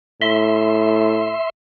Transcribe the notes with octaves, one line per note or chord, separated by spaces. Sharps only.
A2 E5 C6